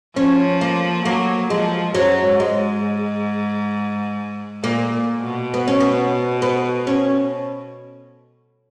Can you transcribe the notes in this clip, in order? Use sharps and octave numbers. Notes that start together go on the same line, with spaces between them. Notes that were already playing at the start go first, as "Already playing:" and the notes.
F3 C#4
A#3
F#3 A#3
F3 G#3
F#2 F#3
G#2
G#3
G#2
A#2 A#3
A#2
B2
B3
C#4
B3
B3
C#4